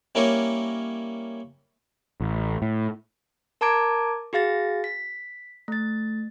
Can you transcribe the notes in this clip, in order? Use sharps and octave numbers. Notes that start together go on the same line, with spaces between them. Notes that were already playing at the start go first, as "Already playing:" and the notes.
G3 A#3 C#4 E4 A#4 C#5
A1
A2
A#4 A5 A#5 D6 G#6 D7
F#4 G#4 F5 A6 A#6
B6
A3 A6